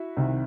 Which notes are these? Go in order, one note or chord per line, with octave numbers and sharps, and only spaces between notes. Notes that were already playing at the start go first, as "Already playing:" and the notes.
Already playing: E4 F#4
C2 C3 D#3